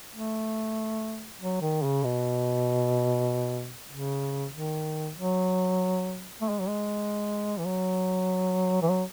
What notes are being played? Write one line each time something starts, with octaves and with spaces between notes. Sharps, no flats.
A3
F#3
D#3
C#3
B2
C#3
D#3
F#3
A3
G#3
F#3
G#3
E3
F#3
E3
F#3